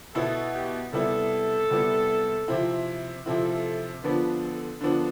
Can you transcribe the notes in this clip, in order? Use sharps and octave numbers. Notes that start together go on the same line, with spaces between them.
B2 B3 E4 A4
G4
C3 G3 B3 E4 A4
C3 G3 B3 E4
C3 F3 C4 E4
C3 F3 C4 E4 A4
D3 F3 B3 D4 B4
A4
D3 F3 B3 D4